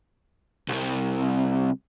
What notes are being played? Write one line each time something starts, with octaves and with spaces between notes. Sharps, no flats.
C2 C3